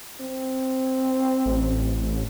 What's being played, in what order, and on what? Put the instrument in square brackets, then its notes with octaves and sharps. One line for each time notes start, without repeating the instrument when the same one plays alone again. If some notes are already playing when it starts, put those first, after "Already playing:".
[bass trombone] C4
[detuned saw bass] A1